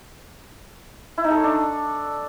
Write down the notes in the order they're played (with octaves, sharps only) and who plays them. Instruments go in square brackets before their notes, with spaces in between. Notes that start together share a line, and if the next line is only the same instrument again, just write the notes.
[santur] E4
D#4
A4
C#5
D4